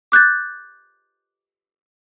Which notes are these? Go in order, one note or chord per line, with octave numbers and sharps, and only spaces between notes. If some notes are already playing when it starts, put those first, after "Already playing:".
D6 F#6 G6 A6